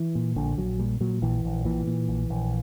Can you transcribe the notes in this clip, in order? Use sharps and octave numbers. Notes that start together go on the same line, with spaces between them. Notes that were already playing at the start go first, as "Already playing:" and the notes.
Already playing: E3
A#2
A#1 D3
A#1 F#3
A#2 G3
A#2 F#3
A#1 E3
A#1
A#2 E3
A#2
A#1
A#1